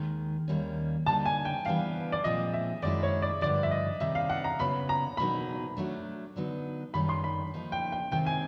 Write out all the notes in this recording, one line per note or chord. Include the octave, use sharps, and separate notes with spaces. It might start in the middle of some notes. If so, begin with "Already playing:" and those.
Already playing: D#2 D#3 G#3
D#2 D#3 G3 A#3 C#4
D2 D3 G3 A#3 D#4 A5
G#5
G5
E3 G3 B3 D4 G4 F5
D5
A#2 F3 G#3 C4 D#5
E5
F#2 D#3 G#3 C#4 E4 D5
C#5
D5
G2 D3 F3 D5
E5
D#5
C3 D#3 G3 E5
F5
F#5
A#5
C#3 F#3 B3 B5
A#5
E2 B2 F#3 A#3 D#4 B5
F#3 A3 D4
D3 F#3 B3 D#4
F#2 D#3 G3 B5
C6
B5
F3 A#3 D#4
G5
G5
C3 D#3 G#3 C4 G5
G#5